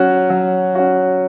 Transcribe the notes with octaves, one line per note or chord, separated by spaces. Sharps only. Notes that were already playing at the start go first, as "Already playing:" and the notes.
Already playing: F#3 C#4 F#4
F#3
C#4 F#4